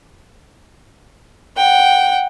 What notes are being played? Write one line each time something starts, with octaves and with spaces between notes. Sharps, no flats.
F#5 G5